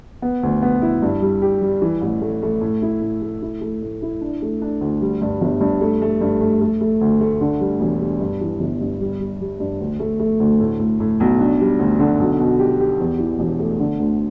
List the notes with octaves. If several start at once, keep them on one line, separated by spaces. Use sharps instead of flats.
B3
D2
B3
E4
G2
G3
G4
G3
E3
A1
A3
A3
A2
E4
A2
A3
E4
A3
A2
E4
D4
A3
D4
D2
G3
G2
G1
G2
A3
A3
G2
A3
A3
A3
D2
A3
D3
G3
E1
G3
G2
E3
G1
G2
G3
G3
G3
G2
D2
A3
A3
D2
A2
A2
A2
B1
D4
G3
D2
D3
B1
B2
G4
G4
E2
E3
E1
A3
D3
D2